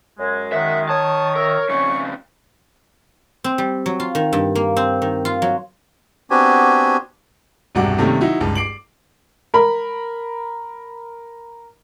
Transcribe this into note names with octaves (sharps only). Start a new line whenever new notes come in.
F#2 G#3
D#3 E5 F#5
C#5 A5 D#6
A#4 E5
F2 C#3 C#6
C4
G3
F#3
F4
D#3
G2
A#3
C4
D#3
F4
F#3
B3 C4 D4 F#4 G4 G#5
E1 C2 G2 F#3 F#5 D6
C3 D#3 G3 A3 A#3 C#4
F#3 D#4 E4
G1 C#2 G#3 A5
D6 C7 D7 F#7
A#4 B5